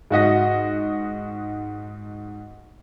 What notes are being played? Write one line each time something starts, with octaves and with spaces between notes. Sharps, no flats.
G#2 F#4 D#5 A#6